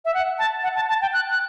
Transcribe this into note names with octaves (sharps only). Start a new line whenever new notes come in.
E5
F#5
A5
F#5
A5
A5
G5
F#6
F#6